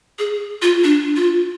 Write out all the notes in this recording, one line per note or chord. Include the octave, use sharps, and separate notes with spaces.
G#4
F4
D4
F4